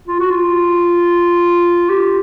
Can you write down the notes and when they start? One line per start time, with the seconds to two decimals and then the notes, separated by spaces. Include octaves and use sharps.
0.07 F4
0.19 F#4
0.30 F4
1.90 G4